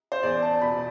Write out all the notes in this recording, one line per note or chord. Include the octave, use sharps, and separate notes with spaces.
C5
E2 D5
A5
B2 B5